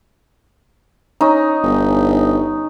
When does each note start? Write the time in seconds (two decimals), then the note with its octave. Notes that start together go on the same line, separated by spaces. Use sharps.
1.21 C#4 D#4 E6
1.63 G1